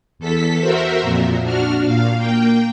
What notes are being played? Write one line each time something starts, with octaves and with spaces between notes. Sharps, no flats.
E2 A4 B6
F#4 A#4 C5 E5
F2 A#2
D4 F#4 F6
A#2 F5
A#3 G5